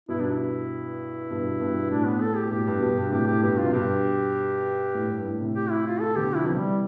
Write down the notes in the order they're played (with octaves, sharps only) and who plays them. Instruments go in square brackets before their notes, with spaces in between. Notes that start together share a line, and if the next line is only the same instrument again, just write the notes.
[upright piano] G2 B2 [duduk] E4
[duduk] D4
E4
[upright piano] G2 B2
G2 B2
[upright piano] A2 [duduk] D4
[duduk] B3
A4
G4
[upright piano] B2
[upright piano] A2 [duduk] G4
[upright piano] G2 B2
G2 B2
G2 B2
[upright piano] A2 C3 [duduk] G4
[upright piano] A2 [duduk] G4
[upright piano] G2 B2 [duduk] G4
[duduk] F4
[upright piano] C3
[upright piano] G2 B2 [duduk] G4
[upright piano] A2
G2
A2
A2 C3
[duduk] G4
E4
F4
A4
[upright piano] B2 D3 [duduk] G4
[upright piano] F3 [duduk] E4
[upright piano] C3 E3 [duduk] F3
[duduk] G3